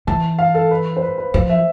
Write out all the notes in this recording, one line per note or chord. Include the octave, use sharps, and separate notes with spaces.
E3 A5
F5
A4
B4
C5
B4
B4
F3 C5
E5